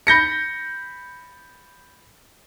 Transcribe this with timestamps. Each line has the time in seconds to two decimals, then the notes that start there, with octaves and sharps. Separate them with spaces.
0.07 B5 G6 A#6 C#7